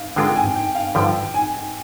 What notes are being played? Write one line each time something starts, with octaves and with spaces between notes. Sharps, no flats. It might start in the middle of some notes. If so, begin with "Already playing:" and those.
Already playing: F5
D3 G#3 D4 F4 A#4 G5
G5
G#5
G5
F5
G2 D3 F3 G5
G#5